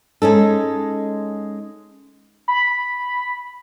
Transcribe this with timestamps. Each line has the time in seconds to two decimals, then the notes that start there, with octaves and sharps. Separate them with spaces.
0.22 G#3 C#4 D#4 A4
2.48 B5